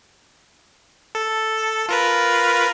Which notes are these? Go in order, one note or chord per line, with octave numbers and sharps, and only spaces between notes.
A4
F4 A#4 B4